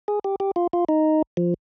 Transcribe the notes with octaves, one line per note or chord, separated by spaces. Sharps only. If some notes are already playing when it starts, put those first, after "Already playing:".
G#4
G4
G4
F4
F4
D#4
F3